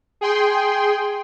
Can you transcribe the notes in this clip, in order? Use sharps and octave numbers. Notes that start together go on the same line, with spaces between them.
G#4 G5 C6